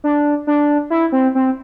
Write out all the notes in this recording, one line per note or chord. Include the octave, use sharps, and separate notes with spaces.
D4
D4
E4
C4
C4